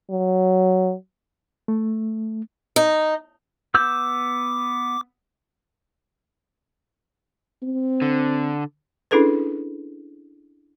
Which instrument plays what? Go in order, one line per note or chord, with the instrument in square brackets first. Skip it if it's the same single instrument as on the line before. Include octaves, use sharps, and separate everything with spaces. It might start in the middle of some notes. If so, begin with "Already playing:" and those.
[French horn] F#3
[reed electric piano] A3
[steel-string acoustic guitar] D#4
[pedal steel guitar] B3 E6 G6 [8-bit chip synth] D6
[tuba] C4
[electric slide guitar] D3
[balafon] C#4 D4 E4 G#4 A4 B4